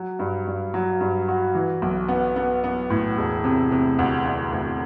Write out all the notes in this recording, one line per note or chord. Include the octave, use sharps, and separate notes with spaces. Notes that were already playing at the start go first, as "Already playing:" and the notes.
Already playing: F#3
G2
G2
F#3
G2
F#4
E3
B1
B3
B3
B3
A2
E1
C3
C3
D2
D2
D2